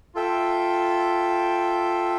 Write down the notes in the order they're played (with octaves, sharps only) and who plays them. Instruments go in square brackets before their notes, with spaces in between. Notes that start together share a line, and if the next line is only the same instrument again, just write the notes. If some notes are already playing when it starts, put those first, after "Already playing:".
[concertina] F4 A4 E5 G5